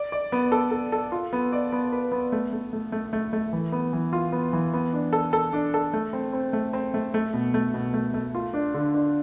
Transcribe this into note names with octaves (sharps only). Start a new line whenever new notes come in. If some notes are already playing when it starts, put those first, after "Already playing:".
Already playing: D5
D5
B3
A4
A4
A4
F4
B3
D5
B3
B4
B3
A3
A3
A3
A3
A3
A3
E3
B3
E3
F4
B3
E3
B3
D4
A4
A4
D4
A4
A3
C4
C4
A3
C4
A3
A3
B2
A3
B2
A3
A3
F4
D4
D3
D4